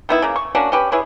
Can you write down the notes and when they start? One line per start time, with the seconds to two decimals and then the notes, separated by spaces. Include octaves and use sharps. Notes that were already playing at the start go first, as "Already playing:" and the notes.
0.09 D#3 B3 E4
0.22 C#3 A#3
0.36 C#6
0.55 A#3 C#4 D4 F#4
0.72 C#4 G4 B4
0.92 E4 G#4 B4 C#5